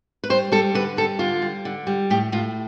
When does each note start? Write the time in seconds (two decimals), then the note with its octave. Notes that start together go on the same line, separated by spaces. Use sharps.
0.24 B4
0.30 G3 C5
0.52 G3 A4
0.74 D3 B4
0.97 G3 A4
1.19 D3 F4
1.42 G3
1.65 D3
1.87 G3
2.10 A2 G4
2.32 A2 F4